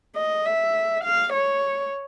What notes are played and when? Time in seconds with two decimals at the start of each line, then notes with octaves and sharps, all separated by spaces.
0.16 D#5
0.46 E5
1.04 F5
1.33 C#5